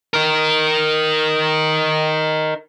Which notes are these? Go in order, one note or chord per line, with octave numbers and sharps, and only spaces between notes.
D#4 A#4